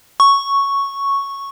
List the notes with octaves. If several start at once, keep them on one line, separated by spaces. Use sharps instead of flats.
C#6